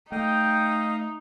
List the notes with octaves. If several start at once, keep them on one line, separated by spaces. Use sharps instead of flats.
A3 D#4 D#5 F5 G5